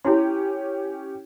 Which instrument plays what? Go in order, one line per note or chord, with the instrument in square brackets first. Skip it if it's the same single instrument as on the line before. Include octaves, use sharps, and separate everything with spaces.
[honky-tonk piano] C#4 G4 [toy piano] E4 C6